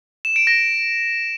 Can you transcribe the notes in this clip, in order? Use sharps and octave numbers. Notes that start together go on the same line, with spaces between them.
E7
D7
A#6